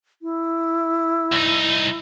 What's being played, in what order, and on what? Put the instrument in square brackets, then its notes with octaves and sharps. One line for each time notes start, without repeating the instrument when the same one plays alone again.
[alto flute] E4
[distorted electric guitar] C2 D#4